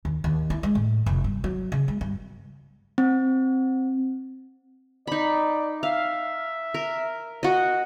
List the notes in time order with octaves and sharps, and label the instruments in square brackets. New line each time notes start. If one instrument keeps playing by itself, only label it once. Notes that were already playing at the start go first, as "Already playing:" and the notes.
[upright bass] D#2
D#2
E4
G#3
A2
F1
G2
F#3
C#3
G#3
G2
[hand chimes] C4
[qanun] D#4 B5 [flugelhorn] D5
[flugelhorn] E5 [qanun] F5
[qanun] A#4
F#4 D#5